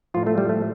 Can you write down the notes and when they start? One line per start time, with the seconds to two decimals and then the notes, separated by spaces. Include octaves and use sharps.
0.14 A2 F3 F4
0.27 A3
0.38 G3
0.49 A3